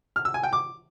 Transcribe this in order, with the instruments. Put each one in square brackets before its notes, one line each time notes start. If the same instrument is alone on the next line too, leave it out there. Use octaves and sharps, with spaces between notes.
[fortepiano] F6
E6
G#5
G5
D6